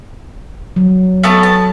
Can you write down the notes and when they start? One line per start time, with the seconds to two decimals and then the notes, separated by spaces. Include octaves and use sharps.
0.76 F#3
1.23 A3 B3 A5
1.43 A5